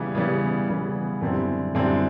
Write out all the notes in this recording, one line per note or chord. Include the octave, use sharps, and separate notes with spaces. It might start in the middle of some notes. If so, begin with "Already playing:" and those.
Already playing: C#3 E3 G3 B3
C#3 E3 G3 B3
C#3 E3 G3 B3
F#2 D3 G3 C4 E4
F#2 D3 G3 C4 E4